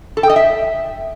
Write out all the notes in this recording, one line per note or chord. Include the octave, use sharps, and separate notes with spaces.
A4
G5
D#5
E5